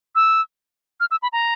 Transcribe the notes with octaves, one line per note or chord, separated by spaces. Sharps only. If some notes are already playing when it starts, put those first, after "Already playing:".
E6
F6
E6
B5
A#5